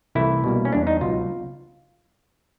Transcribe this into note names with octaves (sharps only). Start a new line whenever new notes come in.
C2 C3 E3 A3 C4 E4
B2 G3 A#3
C#4
E2 C#3 E3 G3 D4
D#4
C#2 B2 F#3 F4